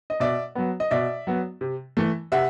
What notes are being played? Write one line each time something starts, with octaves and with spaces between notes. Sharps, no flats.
D#5
B2 D5 E5
F#3 B3
D#5
B2 D5 E5
F#3 B3
C3
E3 A3
C3 E5 F#5